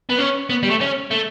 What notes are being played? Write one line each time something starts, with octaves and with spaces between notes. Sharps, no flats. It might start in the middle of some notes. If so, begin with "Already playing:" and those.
B3
C#4
B3
G3
A3
C#4
A3